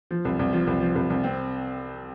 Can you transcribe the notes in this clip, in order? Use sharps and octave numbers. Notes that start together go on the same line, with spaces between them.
F3
C2
C2
F3
C2
F3
C2
C2
C4